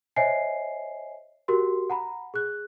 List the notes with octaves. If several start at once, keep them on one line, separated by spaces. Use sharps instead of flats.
C5 C#5 D#5 E5 G#5 C7
F#4 G4 A#4 C6
F#5 A#5 B5
G#4 F#6